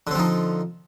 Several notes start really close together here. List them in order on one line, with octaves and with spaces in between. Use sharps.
D3 C4 F3 D#4